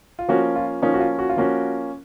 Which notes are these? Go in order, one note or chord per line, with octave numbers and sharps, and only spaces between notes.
F4
F3 A#3 C#4 F#4
F4
F3 A#3 C#4 D#4
F#4
F4
F#4
F4
F3 A#3 C#4 F#4